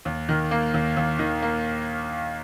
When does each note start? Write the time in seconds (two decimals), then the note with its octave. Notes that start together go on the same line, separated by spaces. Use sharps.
0.05 D#2
0.29 D#3
0.51 A#3
0.74 D#2
0.97 D#2
1.19 D#3
1.42 A#3